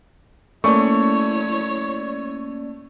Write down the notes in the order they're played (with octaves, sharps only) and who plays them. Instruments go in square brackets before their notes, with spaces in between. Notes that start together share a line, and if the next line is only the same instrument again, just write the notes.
[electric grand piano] A3 [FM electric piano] A#3 C#4 D5 [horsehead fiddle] E4 C#5 [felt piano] C#6